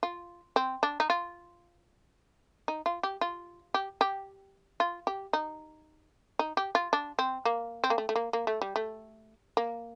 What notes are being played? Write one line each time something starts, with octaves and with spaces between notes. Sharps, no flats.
F4
C4
D4
D#4
F4
D#4
F4
G4
F4
G4
G4
F4
G4
D#4
D#4
G4
F4
D4
C4
A#3
C4
A#3
A3
A3
A#3
A#3
A3
G3
A3
A#3